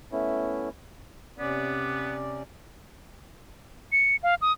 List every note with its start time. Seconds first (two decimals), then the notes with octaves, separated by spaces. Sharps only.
0.12 A3 B3 C#4 E4
1.39 C3 B3 C#4 D5
3.92 C#7
4.23 F5
4.41 D#6